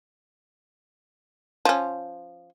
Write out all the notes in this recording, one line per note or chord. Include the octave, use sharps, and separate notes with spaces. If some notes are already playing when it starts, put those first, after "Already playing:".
F3 C#4